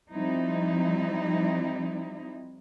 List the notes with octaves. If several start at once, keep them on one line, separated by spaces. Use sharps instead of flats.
F3 G3 C4 D#4 E4